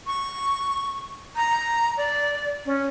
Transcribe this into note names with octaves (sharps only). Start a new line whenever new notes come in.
C#6
A#5
D5
C#4